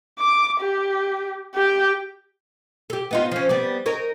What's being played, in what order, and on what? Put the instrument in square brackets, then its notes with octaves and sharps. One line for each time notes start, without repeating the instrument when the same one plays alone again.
[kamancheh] D6
G4
G4 G5
[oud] G4 A4
B3 D#4 F4
F3 C#4
G3 B3 D5
D#4 A#4 C#5